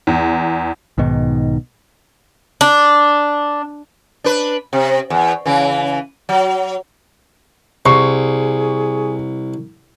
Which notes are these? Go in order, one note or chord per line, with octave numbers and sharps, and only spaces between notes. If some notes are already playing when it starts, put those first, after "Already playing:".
E2
B1 G#2 B2 D#3
D4
D4 B4
C3
E2
C#3 E3
F#3
C2 G#4 C#6 C7